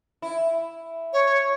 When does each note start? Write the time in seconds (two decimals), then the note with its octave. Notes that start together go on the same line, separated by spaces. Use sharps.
0.22 E4
1.13 C#5